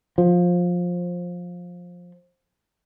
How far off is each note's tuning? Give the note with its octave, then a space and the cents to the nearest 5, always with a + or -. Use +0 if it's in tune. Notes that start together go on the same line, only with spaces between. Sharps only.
F3 +15